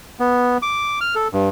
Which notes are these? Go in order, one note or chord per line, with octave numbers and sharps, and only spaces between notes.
B3
D6
F6
A4
G2